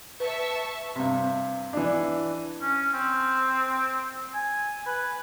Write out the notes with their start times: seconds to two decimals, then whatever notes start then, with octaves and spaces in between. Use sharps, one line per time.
0.20 B4 E5 A5 C#6
0.96 G2 C3
1.73 E3 D4
2.62 C#4
2.94 C4
4.34 G#5
4.87 B4